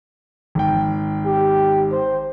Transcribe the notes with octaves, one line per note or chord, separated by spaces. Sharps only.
G#1 G5
G4
C5